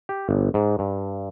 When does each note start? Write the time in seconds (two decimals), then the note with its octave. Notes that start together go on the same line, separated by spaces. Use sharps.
0.09 G4
0.29 G1
0.54 G#2
0.79 G2